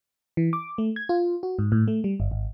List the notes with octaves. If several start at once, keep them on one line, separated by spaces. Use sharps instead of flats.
E3
D6
A3
G#6
F4
F#4
G#2
A2
A3
G3
G1
G#1